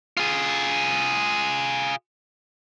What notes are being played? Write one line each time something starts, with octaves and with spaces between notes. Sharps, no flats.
F4 G#4